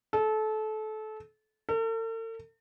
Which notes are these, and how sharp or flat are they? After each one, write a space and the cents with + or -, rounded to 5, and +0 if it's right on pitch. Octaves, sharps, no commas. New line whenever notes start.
A4 -25
A4 +45